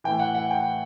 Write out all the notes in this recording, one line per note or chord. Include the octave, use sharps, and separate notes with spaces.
A2 E3 G5
F#5
F#5
G5